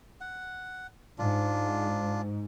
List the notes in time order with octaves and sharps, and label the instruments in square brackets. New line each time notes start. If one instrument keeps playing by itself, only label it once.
[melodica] F#5
[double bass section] G#2 [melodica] D4 F4